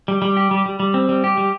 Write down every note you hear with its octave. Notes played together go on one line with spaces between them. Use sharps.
G3
G3
G4
G3
G3
G3
C4
G3
G4
G3